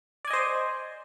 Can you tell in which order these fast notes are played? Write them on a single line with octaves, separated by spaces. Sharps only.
D5 G#5 D#5 C5